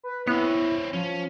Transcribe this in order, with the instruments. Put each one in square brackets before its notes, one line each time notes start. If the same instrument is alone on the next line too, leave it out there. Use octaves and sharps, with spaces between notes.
[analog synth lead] B4
[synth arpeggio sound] B3 [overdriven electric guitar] C4 C#5 [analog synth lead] E4
[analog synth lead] F3 [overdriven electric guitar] C#4